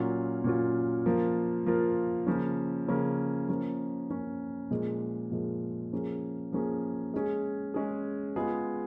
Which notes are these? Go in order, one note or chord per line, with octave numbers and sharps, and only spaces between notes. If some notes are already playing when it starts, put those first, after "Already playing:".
Already playing: A#2 F#3 C#4 F4
A#2 F#3 C#4 F4
F3 A#3 F4 A#4
F3 A#3 F4 A#4
C#3 F3 A#3 C#4
C#3 F3 A#3 C#4
F3 A#3 C#4
F3 A#3 C#4
A#2 F3 G#3
A#2 F3 G#3
F3 A#3 C#4 G#4
F3 A#3 C#4 G#4
G#3 C#4 G#4
G#3 C#4 G#4
G#3 B3 F4 G#4